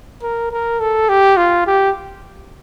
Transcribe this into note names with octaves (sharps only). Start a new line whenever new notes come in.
A#4
A#4
A4
G4
F4
G4